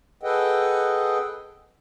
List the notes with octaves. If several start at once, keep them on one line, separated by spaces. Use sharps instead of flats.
G#4 A4 B4 D#5 F#5 G5